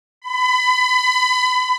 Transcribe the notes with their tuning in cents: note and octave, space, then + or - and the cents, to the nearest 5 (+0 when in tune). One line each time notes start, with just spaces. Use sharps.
B5 +30